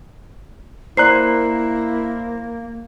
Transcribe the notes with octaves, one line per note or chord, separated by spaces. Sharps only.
A#3 E4 C5 D5 A#5 F#6 C7